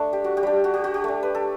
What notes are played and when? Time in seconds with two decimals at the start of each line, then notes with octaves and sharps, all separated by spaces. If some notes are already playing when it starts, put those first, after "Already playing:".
Already playing: A3 D4
0.13 G4
0.24 F#4
0.37 G4
0.43 G3 D4
0.64 F#4
0.74 G4
0.84 F#4
0.94 G4
1.04 A3 D4
1.23 B4
1.35 A4